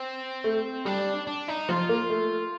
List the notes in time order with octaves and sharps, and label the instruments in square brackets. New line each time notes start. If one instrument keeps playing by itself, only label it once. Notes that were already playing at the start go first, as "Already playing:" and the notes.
Already playing: [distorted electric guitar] C4
[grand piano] A3
[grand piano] G3 [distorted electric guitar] D4
[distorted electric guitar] D4
D#4
[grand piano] F3 [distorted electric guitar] F4
[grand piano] A#3
A3